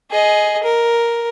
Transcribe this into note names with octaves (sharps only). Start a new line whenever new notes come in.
G#4 D#5
A#4